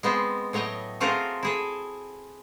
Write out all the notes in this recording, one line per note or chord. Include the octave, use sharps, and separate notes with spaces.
G#3 B3 C4
A2 F#3 C#5 D#5 G5
A3 C4 F4 F#4 G#4 A#4
E4 G#4 A4